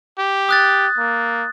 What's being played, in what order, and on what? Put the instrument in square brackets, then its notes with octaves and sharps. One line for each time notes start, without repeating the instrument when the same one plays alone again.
[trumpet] G4
[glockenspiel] D#6 F#6 A6
[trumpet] A#3